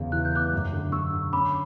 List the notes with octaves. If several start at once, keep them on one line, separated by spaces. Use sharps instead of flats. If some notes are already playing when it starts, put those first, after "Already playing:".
Already playing: E2 C#3
E3 F#6
G6
B3 D6 F#6
F#2
D3
D3 C#6 E6
D3
C#4 B5 D6